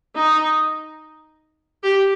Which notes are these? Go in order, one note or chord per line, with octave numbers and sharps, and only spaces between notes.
D#4
G4